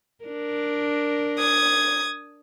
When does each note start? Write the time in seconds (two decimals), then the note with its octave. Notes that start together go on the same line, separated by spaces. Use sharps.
0.25 D4 A#4
1.38 D#6 G#6